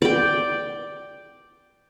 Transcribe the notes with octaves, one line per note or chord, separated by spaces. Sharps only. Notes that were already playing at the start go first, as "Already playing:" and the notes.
D5 G5